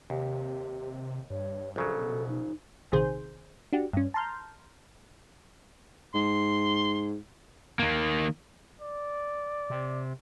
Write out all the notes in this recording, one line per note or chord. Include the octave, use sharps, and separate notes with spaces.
D#2 C3 G4
G2 C#5
A#1 C#3 F#3 A4
B2
D#4
A#1 C3 D#3 G#4 C5 G6
D4 F#4 G4
G2 C#4
A5 A#5 C6 F6 G6
G#2 C6
D#3 A#3
D5
C3